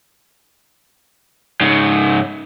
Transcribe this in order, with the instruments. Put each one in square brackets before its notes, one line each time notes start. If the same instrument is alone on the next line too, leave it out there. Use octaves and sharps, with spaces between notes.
[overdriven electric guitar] G#2 C#3